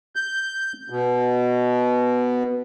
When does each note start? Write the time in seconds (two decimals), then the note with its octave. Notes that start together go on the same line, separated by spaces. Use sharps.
0.16 G6
0.90 B2